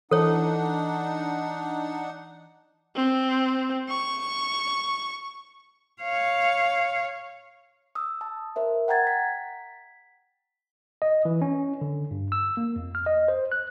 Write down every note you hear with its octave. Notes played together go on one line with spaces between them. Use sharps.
E3 D4 D#4 A4 C#5 F#5
C4
C#6
C#5 F5
D#6 E6
A5
A#4 C5 E5
F#5 G5 A#5 G#6 A6
B6
D#5
E3
C#4
D3
G2
E6
A#3
F2
F6
D#5
C5
F#6